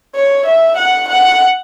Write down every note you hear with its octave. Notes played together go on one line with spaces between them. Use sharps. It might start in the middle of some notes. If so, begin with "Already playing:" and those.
C#5
E5
F#5
F#5